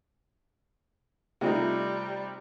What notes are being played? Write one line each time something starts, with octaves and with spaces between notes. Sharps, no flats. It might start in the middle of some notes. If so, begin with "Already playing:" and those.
C3 G3 A3 D#4 F4